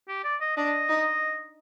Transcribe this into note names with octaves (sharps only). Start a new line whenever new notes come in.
G4
D5
D#5
D4 D#5
D#4